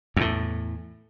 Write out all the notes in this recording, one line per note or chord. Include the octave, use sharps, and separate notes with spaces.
E2 A2